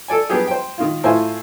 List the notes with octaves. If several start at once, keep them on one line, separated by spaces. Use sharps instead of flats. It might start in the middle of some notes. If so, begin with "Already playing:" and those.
A4 D5 G#5
G3 B3 D4 G4 G#4
C5 G5
D#3 F4
A2 A3 E4 F4 C5 G#5